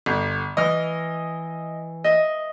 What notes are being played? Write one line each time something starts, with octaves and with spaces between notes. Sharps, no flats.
G1
E3 D#5 F6
D#5 E5